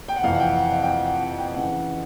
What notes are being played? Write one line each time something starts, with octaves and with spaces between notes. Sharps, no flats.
G5
F#5
F2 C3 E3 F5
F#5
G5
F#5
F5
G5
F#5
F#5
F#5
G5
C#3 E3 F#5